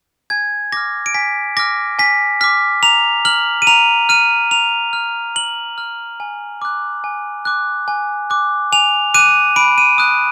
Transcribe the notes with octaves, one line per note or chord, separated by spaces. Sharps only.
G#5 G#6
D6 F6 A#6
D7
G#5 B6
D6 F6 A#6
G#5 B6
D6 F6 B6
A#5 F7
F6 F#7
D#7
A#5 F7
F6 D#7
A#5 F7
F6
A#5 F#7
F6
G#5
D6 F#6
G#5
D6 F#6
G#5
D6 F#6
G#5 F7
D6 F#6 D#7
B5 D7
D#7
D#6 F#6